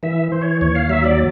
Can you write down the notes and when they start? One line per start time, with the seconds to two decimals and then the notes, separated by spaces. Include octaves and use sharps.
0.03 E3 E5
0.32 E3 C5
0.41 C#5
0.61 D#2 C#5
0.75 F5
0.89 F#3 E5
1.04 D5